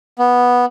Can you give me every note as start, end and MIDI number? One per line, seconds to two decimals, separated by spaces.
0.19 0.65 59